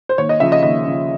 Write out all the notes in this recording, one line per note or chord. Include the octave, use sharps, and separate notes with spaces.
C5
D#2 C#5
D#5
C#3 F3 E5
D#5
D#2 D#5
C#3 F3